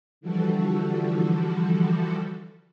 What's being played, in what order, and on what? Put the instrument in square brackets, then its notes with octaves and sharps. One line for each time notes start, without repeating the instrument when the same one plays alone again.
[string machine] D3 E3 F3 G3 F#4 A4